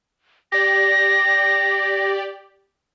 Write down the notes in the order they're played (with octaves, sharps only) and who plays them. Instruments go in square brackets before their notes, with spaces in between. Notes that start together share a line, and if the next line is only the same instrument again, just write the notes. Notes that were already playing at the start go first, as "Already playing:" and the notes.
[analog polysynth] G4 D5 [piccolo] A#6